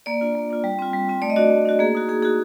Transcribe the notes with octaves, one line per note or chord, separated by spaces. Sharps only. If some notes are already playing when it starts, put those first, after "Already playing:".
A#3 D5
D4 F4
A#3
D4 F4
G3
C4 F4
G3
C4 F4
A3 D5
D#5
D4 F#4 D5
A3
D4 F#4
A#3 G#4
D#4 F#4
A#3 G#4
D#4 F#4 G#4